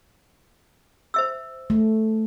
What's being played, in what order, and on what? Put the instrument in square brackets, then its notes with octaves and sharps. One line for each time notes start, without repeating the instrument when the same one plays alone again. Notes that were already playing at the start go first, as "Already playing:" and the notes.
[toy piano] C5 E5 E6
[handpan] A3